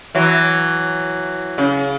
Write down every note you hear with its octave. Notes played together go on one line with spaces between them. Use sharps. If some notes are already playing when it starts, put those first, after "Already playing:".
E3 F#3
C#3